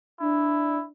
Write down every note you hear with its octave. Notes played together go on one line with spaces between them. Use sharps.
D4 E4